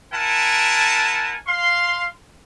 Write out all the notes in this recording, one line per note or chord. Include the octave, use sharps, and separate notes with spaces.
E4 A#4 F#5 G#5 A5
F5 C6